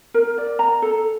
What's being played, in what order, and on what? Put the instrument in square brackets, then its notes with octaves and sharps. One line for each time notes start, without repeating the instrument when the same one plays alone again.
[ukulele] A#4
D5
A#5
A4